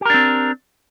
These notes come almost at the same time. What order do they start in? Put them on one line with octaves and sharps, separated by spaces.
G4 A#4 D4 C4